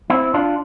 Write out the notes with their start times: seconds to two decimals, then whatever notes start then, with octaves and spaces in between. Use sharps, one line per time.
0.10 C4 E4
0.34 D4 F4